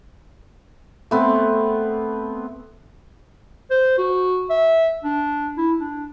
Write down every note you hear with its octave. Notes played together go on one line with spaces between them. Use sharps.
A3 B3 C4
C5
F#4
E5
D4
E4
D4